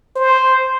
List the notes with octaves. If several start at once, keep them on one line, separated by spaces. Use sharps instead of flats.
C5